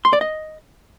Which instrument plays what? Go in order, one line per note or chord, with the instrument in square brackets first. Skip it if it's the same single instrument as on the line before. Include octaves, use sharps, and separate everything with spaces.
[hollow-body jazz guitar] C6
D5
D#5